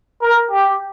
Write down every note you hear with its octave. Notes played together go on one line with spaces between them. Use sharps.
A#4
G4